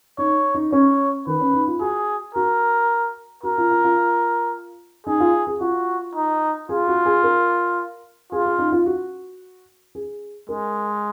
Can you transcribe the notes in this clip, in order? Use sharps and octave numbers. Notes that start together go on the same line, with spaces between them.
D#4 C#5
D#4
C#4 C#5
D#3 B4
C#4
D#4
F4
F#4 G#4
F#4 A#4
F#4 A#4
F4
F4
F4
D#4 G#4
F4
G#4
F4 F#4
D#4
F4 G#4
F#4
G#4
A#4
F4 G#4
G#4
D#4
F4
F#4
G#4
G#3 A#4